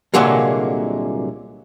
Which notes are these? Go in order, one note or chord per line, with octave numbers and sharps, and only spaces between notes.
C2 A#2 D3 F#3 G#3 A#3